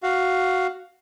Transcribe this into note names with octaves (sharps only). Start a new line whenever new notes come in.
F#4 F5